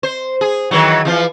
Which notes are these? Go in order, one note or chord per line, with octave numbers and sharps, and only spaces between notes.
C5
G#4
D#3 E3 F#3
E3 F3 F4